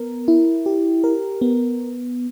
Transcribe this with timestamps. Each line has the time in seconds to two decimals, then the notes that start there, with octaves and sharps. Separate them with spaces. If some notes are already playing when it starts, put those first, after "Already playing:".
Already playing: B3 A#4
0.28 E4
0.66 G4
1.04 A#4
1.41 B3